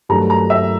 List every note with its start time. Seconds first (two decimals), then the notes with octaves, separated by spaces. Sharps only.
0.09 G2 D#3 F#3 A3 A#5
0.30 A#5
0.50 E5